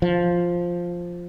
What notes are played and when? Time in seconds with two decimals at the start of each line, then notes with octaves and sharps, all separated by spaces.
0.02 F3